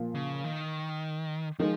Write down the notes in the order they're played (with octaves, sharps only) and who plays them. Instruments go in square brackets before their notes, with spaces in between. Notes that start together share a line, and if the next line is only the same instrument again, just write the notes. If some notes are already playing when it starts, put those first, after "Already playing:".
Already playing: [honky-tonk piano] A#2 F3 A#3
[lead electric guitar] C#3
D#3
[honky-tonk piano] D#3 G#3 [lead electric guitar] F3